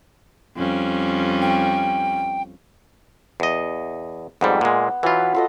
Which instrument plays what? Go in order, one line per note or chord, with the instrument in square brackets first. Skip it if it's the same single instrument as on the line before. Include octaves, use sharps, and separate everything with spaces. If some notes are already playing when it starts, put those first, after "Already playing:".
[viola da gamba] F2 G3 C#4
[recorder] G5
[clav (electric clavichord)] E2 D#5
[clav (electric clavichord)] F2 G#2 G3 [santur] B3
[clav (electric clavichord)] A#2 G#3
[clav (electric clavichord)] E3 F4 [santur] F#3 B4
[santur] F4 A4 D#5